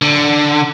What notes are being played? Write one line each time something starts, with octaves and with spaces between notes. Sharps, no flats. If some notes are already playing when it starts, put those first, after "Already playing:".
D3